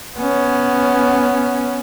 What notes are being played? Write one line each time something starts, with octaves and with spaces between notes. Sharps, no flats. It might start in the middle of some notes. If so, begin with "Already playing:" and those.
B3 C#4